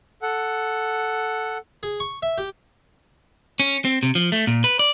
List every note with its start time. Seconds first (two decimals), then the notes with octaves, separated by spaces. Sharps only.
0.22 A4 F#5
1.83 G#4
2.00 C#6
2.22 E5
2.38 G4
3.60 C#4
3.85 C4
4.03 C3
4.15 F3
4.32 A3
4.47 A#2
4.64 B4
4.79 D5